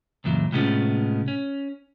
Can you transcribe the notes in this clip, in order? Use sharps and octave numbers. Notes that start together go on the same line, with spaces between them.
C#2 F#2 A#2 E3 F#3
A2 C3 G#3 B3 C#4 F4
C#4